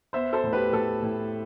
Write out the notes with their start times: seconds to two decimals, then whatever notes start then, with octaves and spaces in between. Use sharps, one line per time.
0.13 B3 C5 E5
0.33 A4 C5
0.44 A2
0.53 G4 B4
0.73 A2 A4
1.02 A2